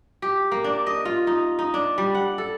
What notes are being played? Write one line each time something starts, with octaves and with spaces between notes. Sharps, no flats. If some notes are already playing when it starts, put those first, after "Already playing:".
G4
A#3
D4
D#5
F4
D#4
D#4
D4
G3
F#5
A4